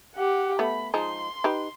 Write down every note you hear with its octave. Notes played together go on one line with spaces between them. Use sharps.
G4 F#5
A3 B3 B5
F3 G#3 D#4 C6
D#4 G4 B4